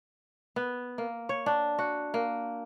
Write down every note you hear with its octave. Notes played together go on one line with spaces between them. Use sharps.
B3
A#3
C#5
D4
F#4
A#3